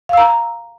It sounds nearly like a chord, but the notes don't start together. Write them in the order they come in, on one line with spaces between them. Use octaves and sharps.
F5 E6 A#5